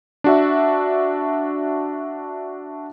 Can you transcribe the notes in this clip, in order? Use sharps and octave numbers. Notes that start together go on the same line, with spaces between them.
D4 F#4 E5